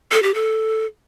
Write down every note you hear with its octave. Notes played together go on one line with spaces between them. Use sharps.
A4
G4
A4